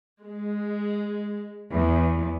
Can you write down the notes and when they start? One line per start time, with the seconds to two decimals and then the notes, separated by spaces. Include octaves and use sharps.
0.23 G#3
1.73 E2